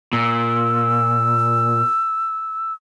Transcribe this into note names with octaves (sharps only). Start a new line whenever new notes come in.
A#2 E6